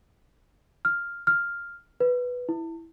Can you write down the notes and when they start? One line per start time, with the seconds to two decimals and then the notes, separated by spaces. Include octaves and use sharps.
0.85 F6
1.27 F6
2.00 B4
2.49 E4